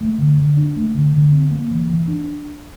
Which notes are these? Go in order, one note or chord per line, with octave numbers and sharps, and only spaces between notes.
A3
D3
D3
D4
A3
D3
D3
C4
A#3
E3
E3
D4